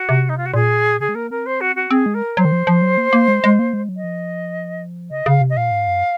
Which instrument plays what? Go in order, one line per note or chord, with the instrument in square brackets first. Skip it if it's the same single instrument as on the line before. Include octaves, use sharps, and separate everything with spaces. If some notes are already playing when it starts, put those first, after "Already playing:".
Already playing: [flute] F#4
[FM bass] C3
[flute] D#4
F4
F#4
[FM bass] A#2 [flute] G#4
[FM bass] C#3 [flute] G#4
[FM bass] G#3
[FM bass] A#3 [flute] A#4
[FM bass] C4 [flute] A#4
[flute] C5
F#4
F#4
[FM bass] C4 [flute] G#4
[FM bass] G#3
[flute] A#4
[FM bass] F#3 [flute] C5
[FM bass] D#3
F3
F3
F#3
A#3
A#3
G#3
G#3
A#3
G#3
F#3
[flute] D#5
[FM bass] F3
[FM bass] C#3 [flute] D#5
[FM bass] C#3 [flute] F5
[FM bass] C3
[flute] D#5
[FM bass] A#2 [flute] F5
[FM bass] G#2
F#2